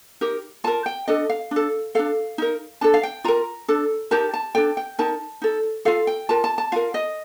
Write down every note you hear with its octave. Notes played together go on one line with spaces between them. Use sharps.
D#4 G4 A#4
F4 A#4 A5
G5
D4 A4 D#5
F5
D4 A4
D4 A4 F5
D#4 A#4
D4 A4 A5
F5
G5
F4 A#4 A#5
D4 A4
D#4 G4 A#4 A5
A5
D4 A4 G5
G5
D#4 A#4 A5
D#4 A4
F4 A4 F5
G5
F4 A#4 A5
A5
A5
F4 A#4 F5
D#5